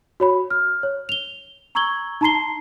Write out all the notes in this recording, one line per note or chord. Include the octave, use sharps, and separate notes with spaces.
F#4 C#5 B5
F6
C#5
F7 G7
A#5 C#6 E6 G#6 F#7 G7
D#4 A5 A#5 C6 C7 G7